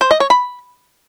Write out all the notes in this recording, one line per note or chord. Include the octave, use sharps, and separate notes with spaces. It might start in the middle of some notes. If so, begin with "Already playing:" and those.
C5
D#5
C#5
B5